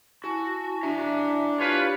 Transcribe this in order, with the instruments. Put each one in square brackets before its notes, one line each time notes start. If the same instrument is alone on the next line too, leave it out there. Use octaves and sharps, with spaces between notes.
[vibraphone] E4 G#5 A5 [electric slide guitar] F#4
[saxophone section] D4 [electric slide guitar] E5 A#5
[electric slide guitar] F4 [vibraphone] G4 [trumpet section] B4 C#5 F5